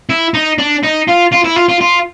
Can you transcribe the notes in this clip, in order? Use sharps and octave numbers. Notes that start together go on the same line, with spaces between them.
E4
D#4
D4
D#4
F4
F4
E4
F4
F4
F4